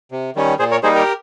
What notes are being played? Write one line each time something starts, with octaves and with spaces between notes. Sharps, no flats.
C3
D#3 G3 C#4
A#2 G#4 C5
A#4 C#5
G3 A#3 D#4 G#4 C5
G4 A#4